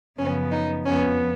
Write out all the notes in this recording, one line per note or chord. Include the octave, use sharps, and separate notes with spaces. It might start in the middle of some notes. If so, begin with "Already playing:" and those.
F#2 C#3 F3 B3 C#4
D#4
F2 F3 B3 C#4